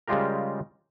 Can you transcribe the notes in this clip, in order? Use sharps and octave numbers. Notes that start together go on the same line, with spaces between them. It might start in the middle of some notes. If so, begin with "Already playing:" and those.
C#3 G3 G#3 F4 G4 A#4